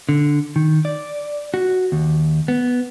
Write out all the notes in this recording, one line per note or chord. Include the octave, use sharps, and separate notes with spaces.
D3
D#3
D5
F#4
D#2
B3